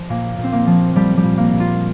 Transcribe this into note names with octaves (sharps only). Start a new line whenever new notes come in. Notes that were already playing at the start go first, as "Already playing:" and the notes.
Already playing: F3
A#2 A#3
A#2
C4
A#3
F3
F3 G3
G3
A#2
A#3
A#2
F4